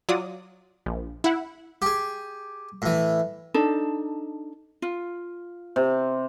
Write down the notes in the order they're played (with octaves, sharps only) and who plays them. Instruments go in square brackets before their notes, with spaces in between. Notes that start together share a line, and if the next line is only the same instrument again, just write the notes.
[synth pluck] F#3 F4 D5 D#6
A#1
E4 F#5
[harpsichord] G4 G#4
A2 E3
[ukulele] D4 D#4 A4
F4
[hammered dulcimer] C3